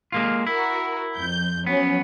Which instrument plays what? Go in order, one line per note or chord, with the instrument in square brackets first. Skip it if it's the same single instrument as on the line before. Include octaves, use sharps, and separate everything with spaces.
[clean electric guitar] G#3 A#3 F4
[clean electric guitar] E4 [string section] F#4 A#4
[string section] F2 G6
[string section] F3 F#3 C#4 [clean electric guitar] B3